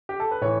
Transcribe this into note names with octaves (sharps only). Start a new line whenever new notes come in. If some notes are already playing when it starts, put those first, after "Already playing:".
G4
A4
B4
A2 E3 C#5